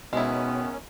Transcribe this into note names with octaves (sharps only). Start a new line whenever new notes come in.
B2 D#3 G#3 B3 C#4 E4